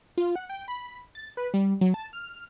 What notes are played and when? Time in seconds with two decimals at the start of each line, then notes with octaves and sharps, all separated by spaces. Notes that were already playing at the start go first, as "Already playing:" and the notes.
0.17 F4
0.36 F#5
0.49 G5
0.68 B5
1.15 A6
1.37 B4
1.54 G3
1.81 F#3
1.94 A5
2.13 F6